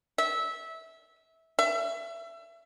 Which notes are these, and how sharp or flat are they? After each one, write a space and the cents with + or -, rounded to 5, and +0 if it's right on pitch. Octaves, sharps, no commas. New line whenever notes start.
E5 -20
E5 +25